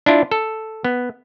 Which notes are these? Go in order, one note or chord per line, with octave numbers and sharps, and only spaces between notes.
D4 E4 F4
A4
B3